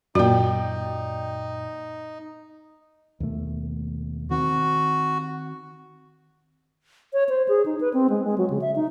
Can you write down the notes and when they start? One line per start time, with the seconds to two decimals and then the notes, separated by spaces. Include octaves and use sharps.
0.15 F#2 A#2 D#4 F#4 D5 G5
3.20 D#2 B2 A3
4.30 D#3 C4 F#4
7.13 C#5
7.29 C5
7.48 G#4
7.66 D#4
7.81 B4
7.94 C4
8.10 G#3
8.24 G#3
8.38 F#3
8.50 C#3
8.61 E5
8.76 D#4